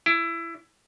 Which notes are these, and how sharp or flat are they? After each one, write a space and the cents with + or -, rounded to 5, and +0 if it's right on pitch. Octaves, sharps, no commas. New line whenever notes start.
E4 +20